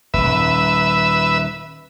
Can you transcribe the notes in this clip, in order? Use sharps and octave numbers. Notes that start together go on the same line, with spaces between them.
D#1 G#1 B4 E5